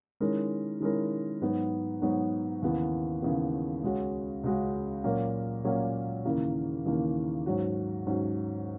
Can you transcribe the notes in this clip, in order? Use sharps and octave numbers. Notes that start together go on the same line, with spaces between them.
D#3 G#3 C#4 E4 A#4
D#3 G#3 C#4 E4 A#4
G#2 F#3 B3 D#4
G#2 F#3 B3 D#4
D#2 C#3 E3 B3
D#2 C#3 E3 B3
C#2 C#3 G#3 C#4 F#4
C#2 C#3 G#3 C#4 F#4
A#2 F#3 A#3 C#4
A#2 F#3 A#3 C#4
D#2 C#3 E3 A#3
D#2 C#3 E3 A#3
G#2 F#3 C#4 F#4
G#2 F#3 C#4 F#4